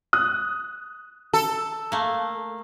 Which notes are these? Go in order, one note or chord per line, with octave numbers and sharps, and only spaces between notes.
D#6 F#6
A4
A3 A#3